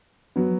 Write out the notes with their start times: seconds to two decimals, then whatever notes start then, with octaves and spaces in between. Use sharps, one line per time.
0.36 F#3 B3